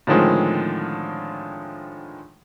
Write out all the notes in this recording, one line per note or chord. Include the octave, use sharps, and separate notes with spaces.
A2 D3 D#3 F3 G#3 C4